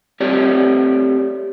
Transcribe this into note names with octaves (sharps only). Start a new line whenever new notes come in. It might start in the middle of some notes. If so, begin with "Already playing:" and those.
A3 C4 G4 A#4 C#5 D5